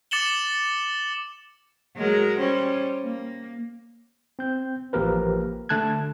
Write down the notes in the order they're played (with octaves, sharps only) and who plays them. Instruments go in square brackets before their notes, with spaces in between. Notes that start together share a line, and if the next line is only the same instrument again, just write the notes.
[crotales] D6 A6 C#7 E7 F#7 G7
[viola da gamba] F#3 G#3 A#4
G3 C#4 C5
A#3
[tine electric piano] C4 G6
A1 F3 A#3 G4 A#4 B4
D3 A3 A5 F#6 G#6